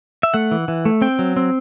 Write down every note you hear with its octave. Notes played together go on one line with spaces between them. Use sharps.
E5
A3 F#5
E3
E3
A3
C4 G5
F#3
C4